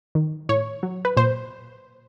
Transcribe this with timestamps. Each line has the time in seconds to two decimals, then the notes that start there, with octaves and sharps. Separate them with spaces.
0.15 D#3
0.49 A2 C#5
0.83 F#3
1.05 B4
1.17 A#2 C5